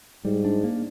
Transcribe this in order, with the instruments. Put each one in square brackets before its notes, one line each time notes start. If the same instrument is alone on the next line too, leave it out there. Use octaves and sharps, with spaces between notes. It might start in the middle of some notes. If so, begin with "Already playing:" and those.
[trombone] G#2 [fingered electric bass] G3
[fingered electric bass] D4
A#3